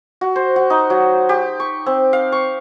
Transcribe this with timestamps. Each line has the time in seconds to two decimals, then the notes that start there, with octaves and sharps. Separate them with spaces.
0.21 F#4
0.36 C5
0.56 F#4
0.70 D#4
0.90 F#3
1.29 G4
1.60 C#6
1.86 C4
2.13 F5
2.32 C#6